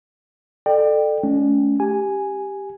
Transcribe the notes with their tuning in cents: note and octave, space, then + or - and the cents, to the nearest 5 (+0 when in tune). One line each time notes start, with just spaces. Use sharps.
A4 +0 D5 +35 G5 +0
A3 -30 C#4 +25
G4 +0 G#5 +0